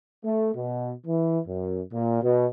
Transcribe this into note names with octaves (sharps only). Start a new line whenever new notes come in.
A3
B2
E3
F#2
A#2
B2